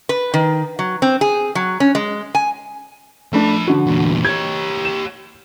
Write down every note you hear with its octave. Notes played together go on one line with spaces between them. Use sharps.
B4
D#3
F#3
C4
G#4
F#3
C#4
G#3
G#5
F3 A3 D4 B5
D3 F#4
E2 A#2
G4 C#5 G#6
E7